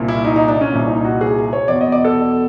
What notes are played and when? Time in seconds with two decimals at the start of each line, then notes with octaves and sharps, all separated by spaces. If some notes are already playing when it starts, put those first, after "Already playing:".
Already playing: C2 A#2
0.08 E4
0.25 D#4
0.36 D#4
0.48 D4
0.61 C#4
0.72 C2 A#2
0.88 D#4
1.04 F#4
1.21 G#4
1.53 C#5
1.68 E2 B2 D5
1.81 D#5
1.92 D5
2.04 A4